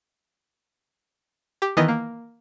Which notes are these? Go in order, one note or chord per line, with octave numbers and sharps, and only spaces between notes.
G4
D#3 E3 B3 D#5
A#3